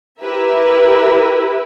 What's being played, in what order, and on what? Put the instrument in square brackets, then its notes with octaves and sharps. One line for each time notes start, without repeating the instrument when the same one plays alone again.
[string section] E4 G4 A#4 B4 E5